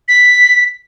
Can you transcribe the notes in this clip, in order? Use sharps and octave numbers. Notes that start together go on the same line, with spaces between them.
B6